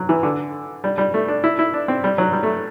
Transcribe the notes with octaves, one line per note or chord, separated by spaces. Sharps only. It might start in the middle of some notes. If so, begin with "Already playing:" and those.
Already playing: F#3
E3
D3
G3
G3
A3
D4
E4
E4
D4
C4
G3
F#3
G3
A3